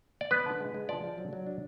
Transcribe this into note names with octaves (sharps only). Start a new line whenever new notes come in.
D5
B3 B4
D3
G#3
G#3
F3 D5
F3
F#3
F#3
D4